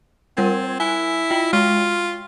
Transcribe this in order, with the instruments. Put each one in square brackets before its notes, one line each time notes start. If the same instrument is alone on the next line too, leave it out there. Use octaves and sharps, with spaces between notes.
[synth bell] G3 A#4 G#6 [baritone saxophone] C4
[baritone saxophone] E4 [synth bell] G#5
[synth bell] F4 G5
[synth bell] G#3 [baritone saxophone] F4